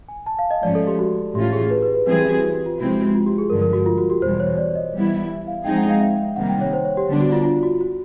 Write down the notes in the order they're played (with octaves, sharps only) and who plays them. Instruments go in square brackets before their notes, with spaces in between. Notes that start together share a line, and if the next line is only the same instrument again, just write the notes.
[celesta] G#5
A5
F5
D#5
[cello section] G#2 F3 A3 C#4 [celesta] D5
[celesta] A4
G4
F#4
[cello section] A2 E3 A3 C#4 F4 [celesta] G4
[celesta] G#4
B4
B4
B4
[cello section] E3 G3 C4 E4 G#4 [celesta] B4
[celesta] G4
F#4
F#4
G4
F4
[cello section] C3 F3 G#3 C4 E4 [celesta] F#4
[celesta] F#4
F#4
F4
G4
G#4
[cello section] G2 D3 F3 G#3 [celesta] A#4
[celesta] A#4
F#4
F4
F#4
G4
[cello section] E2 B2 G3 [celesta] C5
[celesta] C#5
D5
D#5
[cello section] E3 G3 B3 E4
[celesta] E5
F5
[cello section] F3 G#3 C4 D#4 G#4 [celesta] G5
[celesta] F#5
F5
E5
[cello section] C3 D#3 G3 A#3 [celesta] F#5
[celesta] G5
C#5
C5
C#5
G4
[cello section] D3 G3 B3 D4
[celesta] F#4
F4
F4
F#4
F#4